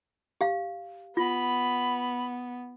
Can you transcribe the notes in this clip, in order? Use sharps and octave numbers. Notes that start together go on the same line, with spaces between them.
G4 F5
B3 F4 B5